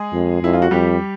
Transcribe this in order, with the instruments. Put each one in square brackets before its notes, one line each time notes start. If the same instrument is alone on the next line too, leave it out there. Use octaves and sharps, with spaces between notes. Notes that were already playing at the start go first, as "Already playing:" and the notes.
Already playing: [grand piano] G#3 G#4
[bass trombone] F2
[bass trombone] F2 [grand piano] E4
[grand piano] F4
F#4
[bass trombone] F2 [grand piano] G3 G4